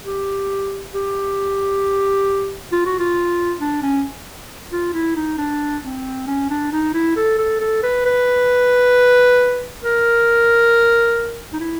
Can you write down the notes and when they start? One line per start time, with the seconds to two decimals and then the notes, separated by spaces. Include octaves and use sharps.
0.04 G4
0.94 G4
2.72 F4
2.86 F#4
2.99 F4
3.60 D4
3.83 C#4
4.72 F4
4.94 E4
5.16 D#4
5.38 D4
5.83 C4
6.27 C#4
6.50 D4
6.72 D#4
6.94 E4
7.16 A4
7.38 A4
7.60 A4
7.83 B4
8.06 B4
9.83 A#4
11.53 D#4
11.60 E4